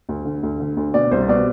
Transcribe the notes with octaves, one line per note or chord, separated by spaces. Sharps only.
D2
D3
D2
D3
D2
B2 D5
C2 C5
B2 D5